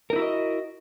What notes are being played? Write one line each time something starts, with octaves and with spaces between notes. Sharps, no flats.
D#4 E4 F#4 A#4 D#5